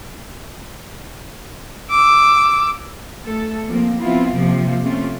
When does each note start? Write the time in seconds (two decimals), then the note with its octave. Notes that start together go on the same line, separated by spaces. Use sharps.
1.90 D6 E6
3.24 A3 A4
3.66 F3 A#3 C4
4.00 F3 B3 C4 E4 F4
4.33 C3 F3 A#3 C4
4.84 C3 A3 C4 C#4 F4